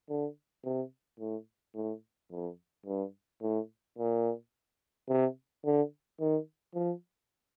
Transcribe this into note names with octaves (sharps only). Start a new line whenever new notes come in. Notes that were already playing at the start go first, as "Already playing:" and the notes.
D3
C3
A2
A2
F2
G2
A2
A#2
C3
D3
D#3
F3